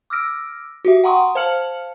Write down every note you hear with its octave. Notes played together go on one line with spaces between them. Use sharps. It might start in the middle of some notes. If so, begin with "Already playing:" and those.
D6 E6 F6 A#6 D7
F#4 G4 E5
F#5 G5 A#5 C6 C#6 D#6
C5 F5 A5 F6 C#7 F#7